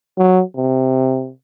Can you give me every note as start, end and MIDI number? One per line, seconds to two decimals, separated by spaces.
0.18 0.42 54
0.56 1.31 48